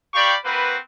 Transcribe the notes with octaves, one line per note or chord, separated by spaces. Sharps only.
G4 D5 F5 G5 B5 C#6
A#3 C4 F#4 B4